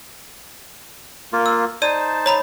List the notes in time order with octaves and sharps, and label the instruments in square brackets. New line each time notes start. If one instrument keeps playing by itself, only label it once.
[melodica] A#3 F4
[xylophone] E6
[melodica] D#4 C5 A5 [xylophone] D5 D#7
[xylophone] C#5 A#5 B5